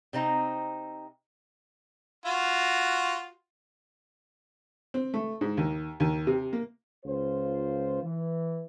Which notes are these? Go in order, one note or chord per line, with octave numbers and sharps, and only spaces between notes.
C3 C4 D#4 A#5
F4 F#4
C4
A3
G#2
D#2
D#2
C3
A#3
C#2 F4 C5
E3